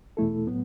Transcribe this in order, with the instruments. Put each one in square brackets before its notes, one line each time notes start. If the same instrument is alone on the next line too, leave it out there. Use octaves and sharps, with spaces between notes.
[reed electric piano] E2 B2 A3 E4 A4
A2 F#3 B3